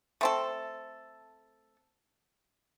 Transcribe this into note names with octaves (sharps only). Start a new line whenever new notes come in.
A3 C4 A4